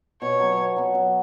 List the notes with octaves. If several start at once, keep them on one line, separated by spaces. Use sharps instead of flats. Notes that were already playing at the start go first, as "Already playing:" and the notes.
B2 C#5
F#3 B3
B2
F#3 B3
F#3